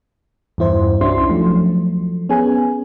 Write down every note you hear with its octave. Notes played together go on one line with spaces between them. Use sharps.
E2 G2 E4 C5
C2 C#4 D4 E4 F#4 C6
F3 F#3 A3
B3 C#4 G#4 G#5